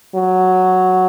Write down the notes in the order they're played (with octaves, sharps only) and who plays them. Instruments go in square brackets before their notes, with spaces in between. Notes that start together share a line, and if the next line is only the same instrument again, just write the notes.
[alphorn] F#3